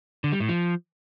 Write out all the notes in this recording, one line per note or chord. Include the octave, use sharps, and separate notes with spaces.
D3
G3
A2
F3